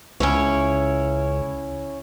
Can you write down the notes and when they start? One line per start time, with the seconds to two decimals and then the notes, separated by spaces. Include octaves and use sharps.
0.20 C#2 C#4 E4 C#5